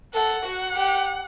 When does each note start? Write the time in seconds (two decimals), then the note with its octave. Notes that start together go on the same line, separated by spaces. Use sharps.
0.14 A4 F#5
0.46 F#4
0.75 G4